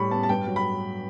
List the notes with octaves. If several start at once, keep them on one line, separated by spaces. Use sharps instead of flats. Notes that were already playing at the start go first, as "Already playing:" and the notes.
Already playing: A2 G3 B5 C#6
B3 A5
A5
G2 G5
F#3
B5